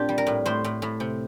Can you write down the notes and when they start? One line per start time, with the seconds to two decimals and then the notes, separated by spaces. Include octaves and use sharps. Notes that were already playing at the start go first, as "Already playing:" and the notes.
Already playing: A#2 C4 D4 F4 G4
0.09 G3
0.18 A#4
0.27 A2
0.46 A2 C5
0.64 A2
0.82 A2
1.00 C3